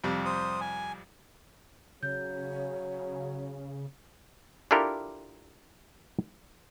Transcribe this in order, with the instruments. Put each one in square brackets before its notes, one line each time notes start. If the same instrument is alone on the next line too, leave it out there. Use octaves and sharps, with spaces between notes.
[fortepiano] F2 C3 G3
[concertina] C5 D#6
G#5
[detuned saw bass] C#3 [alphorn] F#3 [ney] C#5 [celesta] G6
[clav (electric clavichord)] D4 E4 F4 G4 A4 A#4